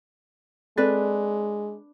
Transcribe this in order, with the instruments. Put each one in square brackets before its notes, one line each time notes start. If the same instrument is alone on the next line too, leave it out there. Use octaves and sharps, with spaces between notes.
[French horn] G#3 [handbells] C4 A4 A6 [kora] D4 B4